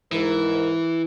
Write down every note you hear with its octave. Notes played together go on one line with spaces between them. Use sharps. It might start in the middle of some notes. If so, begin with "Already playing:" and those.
G#2 E3 A#4